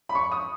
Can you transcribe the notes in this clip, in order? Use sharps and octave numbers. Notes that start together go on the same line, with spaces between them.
B5
C#6
D#6